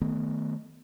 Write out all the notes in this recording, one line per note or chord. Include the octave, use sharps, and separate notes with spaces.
D#3 A3 B3